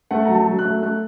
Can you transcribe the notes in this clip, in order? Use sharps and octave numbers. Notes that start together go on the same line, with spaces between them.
A3 F#5
F#3 A#5
A5
F#3
F#6
A3
A3 F#6